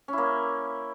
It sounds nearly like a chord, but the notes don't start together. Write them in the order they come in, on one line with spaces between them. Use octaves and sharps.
C#4 E4 A#3